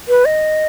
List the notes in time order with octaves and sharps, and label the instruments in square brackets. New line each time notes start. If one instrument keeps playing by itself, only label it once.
[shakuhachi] B4
D#5